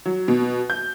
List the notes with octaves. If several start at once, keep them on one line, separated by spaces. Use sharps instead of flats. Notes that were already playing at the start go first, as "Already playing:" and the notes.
F#3
B2
G6